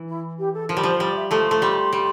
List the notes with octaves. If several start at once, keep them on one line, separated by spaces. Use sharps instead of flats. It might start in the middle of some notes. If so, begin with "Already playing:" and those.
Already playing: E3
E4
G4
A4
F3 A#4
G3
F3 C5
G3 D5
E5
F3 A3 A#5
A3 C6
G3 C6
A#5
C6
G3